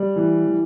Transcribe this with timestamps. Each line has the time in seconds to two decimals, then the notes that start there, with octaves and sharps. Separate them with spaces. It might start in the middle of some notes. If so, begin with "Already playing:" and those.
Already playing: G3
0.16 E3
0.47 E3